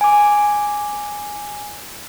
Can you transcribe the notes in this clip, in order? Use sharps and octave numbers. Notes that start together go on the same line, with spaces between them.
G#5 D6